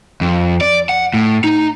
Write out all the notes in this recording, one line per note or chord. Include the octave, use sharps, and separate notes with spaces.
F2
D5
F#5
A2
D#4